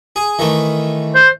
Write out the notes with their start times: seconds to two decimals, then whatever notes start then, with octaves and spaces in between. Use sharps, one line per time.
0.16 G#4
0.39 D#3 E3 A3
1.15 C5